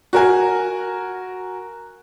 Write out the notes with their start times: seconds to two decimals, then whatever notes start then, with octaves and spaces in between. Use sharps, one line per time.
0.13 F#4 A#4 G#5